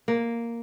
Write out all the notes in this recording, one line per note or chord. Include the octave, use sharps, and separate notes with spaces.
A#3